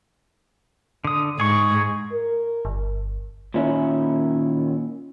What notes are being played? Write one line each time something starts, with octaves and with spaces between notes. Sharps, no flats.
D3 D#6
G#2 G#4 C#6
A#4
G1
A#2 D#3 C#4 E4